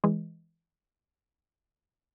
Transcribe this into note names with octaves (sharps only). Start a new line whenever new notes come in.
E3 G#3